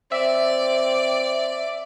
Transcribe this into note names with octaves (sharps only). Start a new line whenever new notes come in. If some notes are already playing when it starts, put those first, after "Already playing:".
C4 D5 E5